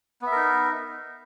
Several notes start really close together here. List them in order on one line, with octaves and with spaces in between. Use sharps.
B3 E5 A#4 D#4